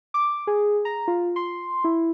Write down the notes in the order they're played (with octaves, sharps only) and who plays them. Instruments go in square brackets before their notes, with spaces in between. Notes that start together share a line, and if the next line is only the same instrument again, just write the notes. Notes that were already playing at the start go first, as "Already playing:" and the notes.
[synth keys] D6
G#4
A#5
F4
C6
E4